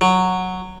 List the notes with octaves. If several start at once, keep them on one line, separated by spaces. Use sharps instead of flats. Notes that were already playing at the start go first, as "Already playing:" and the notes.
F#3